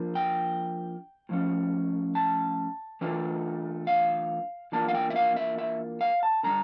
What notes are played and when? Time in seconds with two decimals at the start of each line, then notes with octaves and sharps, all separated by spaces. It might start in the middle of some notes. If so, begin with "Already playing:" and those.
Already playing: F3 A#3 D4
0.15 G5
1.29 A2 F3 C#4
2.15 A5
3.01 E3 A3 D4 F4
3.87 F5
4.72 E3 A#3 D4 F4 A5
4.88 F5
4.94 G5
5.10 E5
5.16 F5
5.36 E5
5.58 E5
6.01 F5
6.23 A5
6.43 D3 G3 D4 A#5